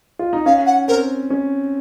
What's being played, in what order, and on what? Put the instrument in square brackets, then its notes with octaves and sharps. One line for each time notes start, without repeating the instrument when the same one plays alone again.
[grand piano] F4
D#4
[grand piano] C#4 [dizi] F5
[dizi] F#5
[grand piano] C4 [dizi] A#4
[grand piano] C#4